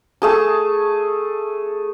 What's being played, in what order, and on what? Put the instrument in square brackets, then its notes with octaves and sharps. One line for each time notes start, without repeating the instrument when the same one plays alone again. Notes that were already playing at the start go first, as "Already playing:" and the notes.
[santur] A3 G#4 A5